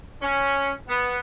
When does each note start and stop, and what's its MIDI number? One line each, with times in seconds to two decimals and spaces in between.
0.22 0.71 61
0.88 1.18 59